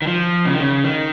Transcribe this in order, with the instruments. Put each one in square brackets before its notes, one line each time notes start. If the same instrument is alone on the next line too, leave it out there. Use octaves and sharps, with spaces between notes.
[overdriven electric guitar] D#3
F3
C#3
D#3
C#3
D#3